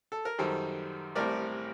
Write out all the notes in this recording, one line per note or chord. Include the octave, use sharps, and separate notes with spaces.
A4
A#4
F#2 D#3 G3 A4 C5
A1 A2 G3 C4 A#4 D5